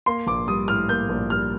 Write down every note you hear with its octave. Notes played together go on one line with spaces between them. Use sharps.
A#3 C6
A#1 D6
G3 D#6
A2 F6
A#3 G6
A#1
G3 F6